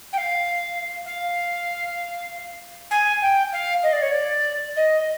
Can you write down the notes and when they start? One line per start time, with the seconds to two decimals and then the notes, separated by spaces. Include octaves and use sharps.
0.13 G5
0.18 F5
1.06 F5
2.91 G#5
3.22 G5
3.53 F5
3.83 D#5
3.93 D5
4.02 C#5
4.12 D5
4.77 D#5